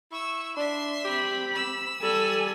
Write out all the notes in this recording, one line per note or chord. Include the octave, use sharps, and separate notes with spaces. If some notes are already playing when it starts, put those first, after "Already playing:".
E4 C#6 E6
D4 E5 C6
C4 G4 B5
E6
G3 A4 G#5